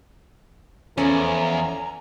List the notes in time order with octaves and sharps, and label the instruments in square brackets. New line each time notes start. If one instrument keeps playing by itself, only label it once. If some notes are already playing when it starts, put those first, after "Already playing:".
[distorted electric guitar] E2 [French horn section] F3 A4 [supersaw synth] C#4 [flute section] G#5 A#5